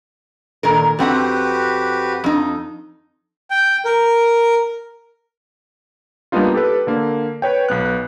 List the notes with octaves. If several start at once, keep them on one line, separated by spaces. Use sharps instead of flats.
A#2 D#3 A#4
F2 C4 F#4 G4 B4 F#5
F2 D#4
G5
A#4
G3 A#3 B3 D4 D#4 F4
G4 A4 B4
D3 A#3
B4 C#5 G5
B1 B3 F#6